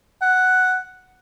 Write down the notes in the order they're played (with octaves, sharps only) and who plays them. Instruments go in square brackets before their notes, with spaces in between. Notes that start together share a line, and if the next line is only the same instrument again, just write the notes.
[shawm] F#5